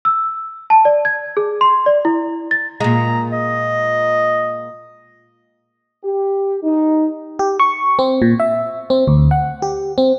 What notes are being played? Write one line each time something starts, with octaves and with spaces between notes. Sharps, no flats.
E6
A5
D5
G#6
G#4
C6
D5
E4
A6
A#2 G#3 A#5
D#5
G4
D#4
G4
C#6
C4
A#2
E5
C4
D2
F#5
G4
C4